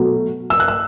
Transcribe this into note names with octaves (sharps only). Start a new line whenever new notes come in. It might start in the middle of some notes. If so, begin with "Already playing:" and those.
Already playing: B2 F#3 A3
E6
F#6
E6